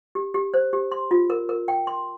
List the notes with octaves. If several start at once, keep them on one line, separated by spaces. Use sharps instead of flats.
G4
G4
C5
G4
C6
F4
A#4
A#4
G5
C6